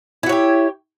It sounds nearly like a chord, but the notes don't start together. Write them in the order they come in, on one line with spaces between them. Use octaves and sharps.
E4 F#4 C#5 G4